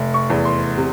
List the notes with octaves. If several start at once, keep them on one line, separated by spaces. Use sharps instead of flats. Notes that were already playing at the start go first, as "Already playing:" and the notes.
Already playing: F1
C#6
E2
C6
C3